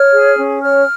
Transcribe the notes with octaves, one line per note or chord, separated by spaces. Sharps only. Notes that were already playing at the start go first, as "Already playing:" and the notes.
Already playing: C#5 F6
G#4
C#4
C#5 F6